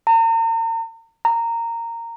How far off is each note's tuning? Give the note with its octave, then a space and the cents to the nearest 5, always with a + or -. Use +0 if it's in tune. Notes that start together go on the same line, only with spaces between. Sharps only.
A#5 -40
A#5 -15